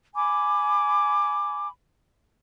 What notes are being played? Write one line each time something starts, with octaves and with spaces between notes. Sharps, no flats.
G#5 B5 D6